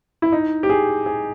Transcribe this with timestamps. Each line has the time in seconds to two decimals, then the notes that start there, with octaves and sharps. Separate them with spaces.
0.22 E4
0.32 D#4
0.63 G4
0.69 G#4
1.06 G#4